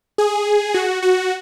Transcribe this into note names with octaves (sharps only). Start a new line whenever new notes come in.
G#4
F#4
F#4